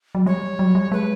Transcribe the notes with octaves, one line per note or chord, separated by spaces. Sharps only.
F#3
G3 C#5
F#3
G3
G#3 B4